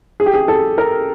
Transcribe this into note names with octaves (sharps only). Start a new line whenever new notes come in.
G#4
G4
G#4
A4
A#4